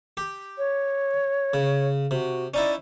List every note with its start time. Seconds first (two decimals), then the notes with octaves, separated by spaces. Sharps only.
0.17 G4
0.58 C#5
1.54 C#3
2.11 C3 F#4
2.54 C#4 D#4 E4 D5